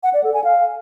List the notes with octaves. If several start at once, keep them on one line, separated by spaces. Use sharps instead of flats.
F#5
D5
A4
G#5
F5